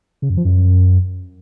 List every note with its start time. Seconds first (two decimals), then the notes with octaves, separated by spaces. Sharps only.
0.22 C#3
0.30 F#2
0.37 F3
0.45 F#2